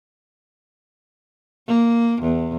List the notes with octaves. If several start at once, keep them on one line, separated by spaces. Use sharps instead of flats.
A#3
E2